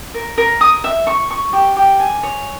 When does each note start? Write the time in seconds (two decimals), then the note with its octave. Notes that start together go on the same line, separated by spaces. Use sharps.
0.14 A#4
0.38 A#4
0.61 D#6
0.84 E5
1.07 C#6
1.30 C#6
1.53 G4
1.76 G4
2.00 G#5
2.23 C#5